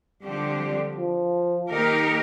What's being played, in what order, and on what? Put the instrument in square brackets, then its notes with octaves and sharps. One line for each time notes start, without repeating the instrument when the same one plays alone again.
[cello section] D3 F3 C4 G4 [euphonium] G3
[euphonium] F3
[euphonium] D#3 [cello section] A#3 D#4 G4 A#4